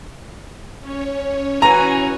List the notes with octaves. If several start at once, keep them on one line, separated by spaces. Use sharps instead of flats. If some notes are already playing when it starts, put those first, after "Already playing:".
C#4 C#5
E3 F#4 G#5 A#5